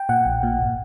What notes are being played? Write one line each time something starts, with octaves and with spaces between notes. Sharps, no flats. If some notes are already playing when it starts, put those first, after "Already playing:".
Already playing: G5
A#2 F#5
A#1
A#2
G1